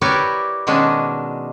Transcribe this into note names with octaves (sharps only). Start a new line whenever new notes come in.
E4 G4 A#4 B4 C#5 D5
B2 D#3 G#3 C#4 D4